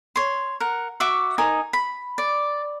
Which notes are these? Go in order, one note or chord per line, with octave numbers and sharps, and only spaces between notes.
C#5 C6
A#4 F#5
F#4 E5 C#6 D6
D#4 A#4 G#5 D#6
B5
D5